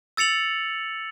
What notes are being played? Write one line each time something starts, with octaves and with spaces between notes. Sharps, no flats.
E6 A6 C#7 F7 F#7